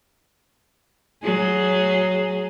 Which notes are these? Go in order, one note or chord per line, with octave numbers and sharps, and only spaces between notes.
F#3 G#4